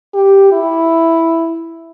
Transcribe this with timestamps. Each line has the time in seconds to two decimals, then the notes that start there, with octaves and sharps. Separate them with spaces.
0.14 G4
0.52 E4